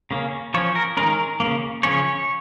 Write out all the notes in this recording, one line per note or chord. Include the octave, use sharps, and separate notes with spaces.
C#3 A#3 C#4
F3 C#4 C#5
A#4
D#3 G#3 C#4 A#4
C#3 F3 A#3
C#3 F3 C#4 C#5